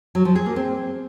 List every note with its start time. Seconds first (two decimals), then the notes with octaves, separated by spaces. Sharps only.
0.15 F#3
0.25 F3
0.36 G#4
0.46 A#3
0.56 C4